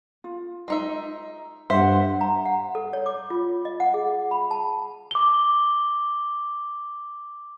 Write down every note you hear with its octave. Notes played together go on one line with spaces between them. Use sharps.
F4
G#3 D#4 E5
G2 C5 E5 F#5
A#5
F#5
A4
C#5
D6
F4
D#5
F#5
G#4
B5
A5
D6 G7